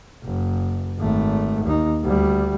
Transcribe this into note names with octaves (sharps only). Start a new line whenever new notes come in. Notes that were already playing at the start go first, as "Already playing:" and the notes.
F#1
G#1 A3
D#2 D#4
D2 G3